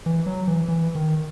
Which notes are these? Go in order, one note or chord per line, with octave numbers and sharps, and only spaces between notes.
E3
F#3
E3
E3
D#3